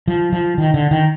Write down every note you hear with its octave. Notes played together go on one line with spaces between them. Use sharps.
F3
F3
D#3
D3
D#3